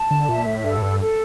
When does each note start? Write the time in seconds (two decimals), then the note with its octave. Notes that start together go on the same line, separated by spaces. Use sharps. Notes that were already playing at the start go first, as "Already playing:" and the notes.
Already playing: A5
0.11 D3
0.28 A#2 E5
0.46 A2
0.63 G2 A4
0.77 A2
0.82 G2
1.00 A4